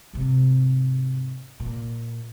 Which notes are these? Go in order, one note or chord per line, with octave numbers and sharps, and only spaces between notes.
G#2 C3
A#2